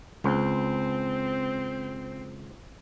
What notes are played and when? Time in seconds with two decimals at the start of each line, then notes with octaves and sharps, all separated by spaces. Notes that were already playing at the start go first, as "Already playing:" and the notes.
0.24 C#2 C4